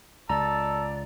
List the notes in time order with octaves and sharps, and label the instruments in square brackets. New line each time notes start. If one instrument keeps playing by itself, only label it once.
[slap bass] C#2 [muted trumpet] A4 [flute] D5 [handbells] A#5